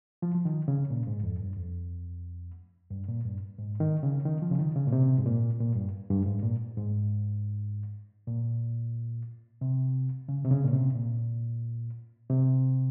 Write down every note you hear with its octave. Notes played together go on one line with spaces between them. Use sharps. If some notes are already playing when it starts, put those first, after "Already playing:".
F3
F3
D#3
C#3
A#2
G#2
F2
G2
F2
G2
A#2
G2
G#2
D#3
C#3
D#3
F3
C#3
D#3
C#3
A#2
C3
G#2
A#2
A#2
G2
G2
G#2
A#2
G#2
A#2
C3
C#3
C3
C#3
A#2
C3
A#2
C3